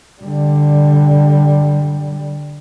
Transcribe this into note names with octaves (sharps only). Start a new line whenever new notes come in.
D3 G3